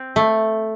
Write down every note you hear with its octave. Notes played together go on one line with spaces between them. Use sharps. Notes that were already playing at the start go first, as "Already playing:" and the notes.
Already playing: C4
A3